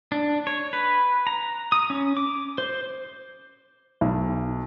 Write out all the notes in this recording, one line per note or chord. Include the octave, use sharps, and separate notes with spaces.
D4
C#5
B4
A#5
D#6
C#4
D6
C5
B1